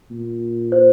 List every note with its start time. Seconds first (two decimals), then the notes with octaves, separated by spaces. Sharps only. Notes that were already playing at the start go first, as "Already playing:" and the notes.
0.10 A#2
0.72 C5